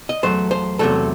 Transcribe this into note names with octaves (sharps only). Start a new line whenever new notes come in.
D#5
E2 C3 F#3 A3 C5
C5
E2 C3 F#3 A3 A4